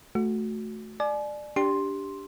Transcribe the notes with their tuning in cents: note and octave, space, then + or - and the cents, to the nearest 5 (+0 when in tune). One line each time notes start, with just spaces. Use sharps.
A3 -10 F#4 -10
D5 +20 G#5 +40
D4 -10 G4 +0 C6 +5